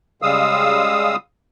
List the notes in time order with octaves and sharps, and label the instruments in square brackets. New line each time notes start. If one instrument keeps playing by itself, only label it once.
[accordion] C#3 G3 G#3 F5 D#6 E6